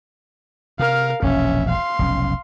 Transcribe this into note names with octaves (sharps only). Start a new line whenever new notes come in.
C3 A#4 F5
E1 A#1 C#4 E5
F5 C6
F1 B1 C#4